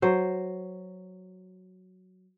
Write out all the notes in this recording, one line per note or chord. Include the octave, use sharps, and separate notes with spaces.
F#3 C5